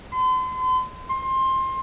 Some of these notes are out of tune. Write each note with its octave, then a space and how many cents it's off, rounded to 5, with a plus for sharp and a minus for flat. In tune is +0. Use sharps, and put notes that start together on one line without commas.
C6 -40
C6 +20